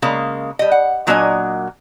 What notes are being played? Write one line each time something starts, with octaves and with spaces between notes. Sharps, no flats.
C#3 G#3 A#3
G3 D#5
F#5
A#2 F#3 A#3 D4 D#5 G#5